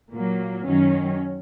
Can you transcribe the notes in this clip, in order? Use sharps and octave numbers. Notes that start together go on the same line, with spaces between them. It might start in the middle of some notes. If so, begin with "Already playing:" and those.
A#2 F#3 A#3
F#2 D#3 F#3 C#4